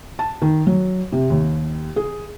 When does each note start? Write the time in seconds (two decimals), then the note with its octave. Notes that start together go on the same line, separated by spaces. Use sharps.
0.19 A5
0.42 D#3
0.67 F#3
1.12 C3
1.30 D#2
1.96 G#4